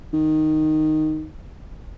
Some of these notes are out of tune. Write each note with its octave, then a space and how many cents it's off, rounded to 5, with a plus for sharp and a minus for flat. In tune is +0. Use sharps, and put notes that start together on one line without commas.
D#3 -5